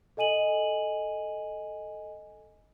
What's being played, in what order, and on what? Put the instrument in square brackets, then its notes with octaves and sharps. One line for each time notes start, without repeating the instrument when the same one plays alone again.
[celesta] A4 D#5 G#5 D#7 F#7